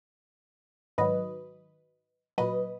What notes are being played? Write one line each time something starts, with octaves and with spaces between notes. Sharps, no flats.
G#2 D#3 F#3 B4 D#5
A#2 F#3 B4 D#5